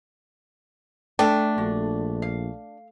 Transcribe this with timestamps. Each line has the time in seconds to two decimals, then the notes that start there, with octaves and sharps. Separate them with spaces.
1.19 A3 D4 A4 G5
1.58 A#1 F#4
2.22 F5